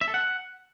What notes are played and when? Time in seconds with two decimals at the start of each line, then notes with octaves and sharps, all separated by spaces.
0.01 E5
0.08 A4
0.14 F#5